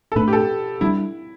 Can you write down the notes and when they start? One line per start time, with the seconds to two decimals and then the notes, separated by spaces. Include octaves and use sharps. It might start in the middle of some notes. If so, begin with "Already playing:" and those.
0.12 A4
0.16 A2 A3 D4 B4
0.28 G4
0.33 A4
0.81 G3 D4 E4